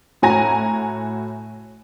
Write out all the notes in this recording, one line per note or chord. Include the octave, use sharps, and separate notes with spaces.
A2 F#4 G#5 A#5 A#6